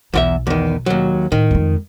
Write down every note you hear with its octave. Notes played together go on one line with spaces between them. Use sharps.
B1 E2 F4 E5
E2 D#3
D#2 F#3
A2 D#3
F2 G#3